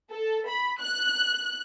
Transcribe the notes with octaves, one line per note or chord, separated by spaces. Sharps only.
A4
B5
F#6